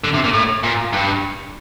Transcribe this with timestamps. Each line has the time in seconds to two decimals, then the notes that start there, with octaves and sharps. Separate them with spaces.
0.04 D3
0.14 C3
0.24 A#2
0.34 A2
0.63 A#2
0.93 G2